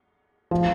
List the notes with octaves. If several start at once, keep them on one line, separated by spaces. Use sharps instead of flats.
F3